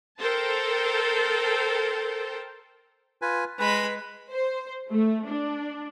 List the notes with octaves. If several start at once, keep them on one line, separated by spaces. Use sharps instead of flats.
A4 A#4 C5 G5 A5
F4 B4 G#5
G#3 B4 B5
C5
A3
D4